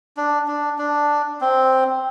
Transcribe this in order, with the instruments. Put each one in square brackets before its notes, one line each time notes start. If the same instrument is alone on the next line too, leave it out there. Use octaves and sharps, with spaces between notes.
[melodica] D4
D4
D4
C4